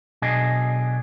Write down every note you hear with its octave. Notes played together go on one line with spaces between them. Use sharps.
B1 B2 D4 G#4 D#5